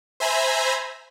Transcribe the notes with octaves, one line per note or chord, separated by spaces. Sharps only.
C5 E5 G#5 A#5 B5